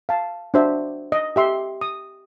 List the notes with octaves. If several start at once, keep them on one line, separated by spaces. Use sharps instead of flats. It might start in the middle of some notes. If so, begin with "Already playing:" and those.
F5 A5
D4 F#4 C5 D5 E5
D#5
G4 E5 C6
D#6